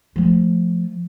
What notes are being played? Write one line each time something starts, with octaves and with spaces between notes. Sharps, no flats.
F3 A3